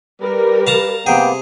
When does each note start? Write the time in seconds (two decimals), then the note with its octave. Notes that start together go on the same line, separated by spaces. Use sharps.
0.22 G3 A#4 B4
0.67 F5 A5 A#5
1.06 C3 A#3 B3 G#4 G5